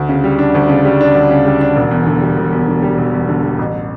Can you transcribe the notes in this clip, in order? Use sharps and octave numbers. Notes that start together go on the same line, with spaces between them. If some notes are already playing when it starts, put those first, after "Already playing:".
Already playing: D2
C#3
G3
D4
D2
C#3
G3
D4
D2
C#3
G3
D4
E1
E2
D3
G3
E1
E2
D3
G3
E1
E2
D3
G3
A1